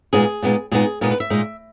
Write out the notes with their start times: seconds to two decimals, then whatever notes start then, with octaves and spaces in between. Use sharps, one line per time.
0.13 A#2 G#3 B3 D#4 G#4
0.42 A#2 G#3 B3 D#4
0.72 A#2 G#3 B3 D#4 G#4
1.01 A#2 G#3 B3 D#4 A#4
1.11 B4
1.20 E5
1.30 A#2 G#3 D#4